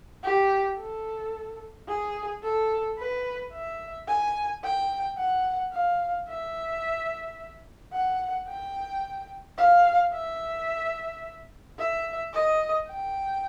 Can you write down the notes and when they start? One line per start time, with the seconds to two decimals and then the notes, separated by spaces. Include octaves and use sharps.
0.23 G4
0.79 A4
1.87 G#4
2.43 A4
2.98 B4
3.52 E5
4.08 G#5
4.64 G5
5.17 F#5
5.72 F5
6.28 E5
7.93 F#5
8.48 G5
9.58 F5
10.13 E5
11.78 E5
12.33 D#5
12.88 G5